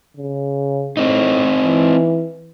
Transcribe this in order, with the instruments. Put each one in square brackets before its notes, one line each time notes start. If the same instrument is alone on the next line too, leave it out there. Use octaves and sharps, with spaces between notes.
[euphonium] C#3
[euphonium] A2 [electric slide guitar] C4 D#4
[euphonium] E3